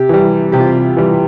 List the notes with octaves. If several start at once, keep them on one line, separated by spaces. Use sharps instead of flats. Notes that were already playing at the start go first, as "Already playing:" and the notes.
Already playing: C3 G4
E3 G3
C3 G4
F4
G4
E3 G3